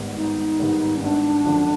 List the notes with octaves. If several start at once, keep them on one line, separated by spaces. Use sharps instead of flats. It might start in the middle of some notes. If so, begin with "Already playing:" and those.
Already playing: G#1 G#2 D#3 G3 B3
G#1 D#4
G#2 D#3 G3 B3
C#4
G#1 D4
F#2 D3 F3